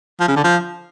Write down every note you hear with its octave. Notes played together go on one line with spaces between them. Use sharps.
F3
C#3
D3
F3